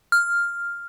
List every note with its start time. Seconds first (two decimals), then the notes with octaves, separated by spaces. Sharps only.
0.12 F6